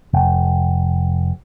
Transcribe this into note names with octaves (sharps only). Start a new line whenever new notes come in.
F1